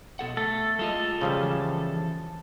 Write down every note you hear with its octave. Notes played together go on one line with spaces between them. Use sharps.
B2 A4 F#5
A3 A4
G#3 F4 A4 D#5
C#3 F3 G3
E3